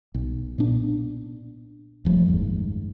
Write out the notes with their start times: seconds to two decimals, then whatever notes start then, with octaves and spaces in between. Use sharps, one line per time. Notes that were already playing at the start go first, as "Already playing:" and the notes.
0.15 B1
0.58 A#2 B3 D4
2.05 E1 F3 G3 A3
2.26 F#1 D#2 G#2